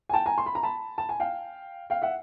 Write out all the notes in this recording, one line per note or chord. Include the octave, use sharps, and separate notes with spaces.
G#5
G5 A5
G#5 A#5
C6
B5
A#5
A5 B5
A5
G#5
F5 G5
F5 G5
E5 F#5